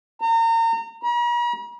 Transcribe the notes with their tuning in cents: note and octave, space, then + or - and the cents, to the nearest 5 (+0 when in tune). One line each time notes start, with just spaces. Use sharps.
A#5 -35
A#5 +45